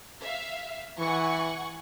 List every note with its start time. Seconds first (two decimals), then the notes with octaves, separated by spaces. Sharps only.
0.22 E5 F5
0.99 E3 F#5 G#5 C#6